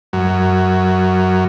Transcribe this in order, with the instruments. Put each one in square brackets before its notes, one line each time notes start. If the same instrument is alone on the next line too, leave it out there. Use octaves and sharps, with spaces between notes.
[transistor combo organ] F#2